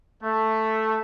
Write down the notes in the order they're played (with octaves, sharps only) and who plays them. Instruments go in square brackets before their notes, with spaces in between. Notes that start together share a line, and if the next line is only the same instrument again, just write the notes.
[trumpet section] A3